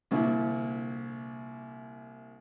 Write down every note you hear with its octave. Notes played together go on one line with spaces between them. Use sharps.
C2 A#2 D3 E4